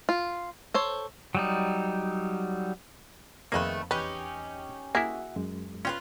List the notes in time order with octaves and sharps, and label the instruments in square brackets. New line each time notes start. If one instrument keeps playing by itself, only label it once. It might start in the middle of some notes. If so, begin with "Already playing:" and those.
[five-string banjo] F4
A4 C5 C#5
[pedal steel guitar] F#3 G3 D#4
[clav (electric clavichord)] F2 A#3 [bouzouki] D#3 A3 B4 [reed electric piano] G#4
[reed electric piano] E2 [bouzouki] C#4 D#4 G4 [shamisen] B4
[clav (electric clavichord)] A#3 E4 [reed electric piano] F#4 E5 F#5 [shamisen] G#4
[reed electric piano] F#2 G#3
[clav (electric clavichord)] C#4 [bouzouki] F4 G4 B4